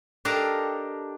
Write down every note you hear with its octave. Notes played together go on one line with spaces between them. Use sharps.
D4 G4 A4 A#4 D#5 F5